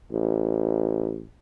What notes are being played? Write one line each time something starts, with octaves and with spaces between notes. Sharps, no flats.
A1